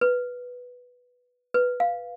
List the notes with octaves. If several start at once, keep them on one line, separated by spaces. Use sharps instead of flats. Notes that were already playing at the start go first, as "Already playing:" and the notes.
B4
B4
F5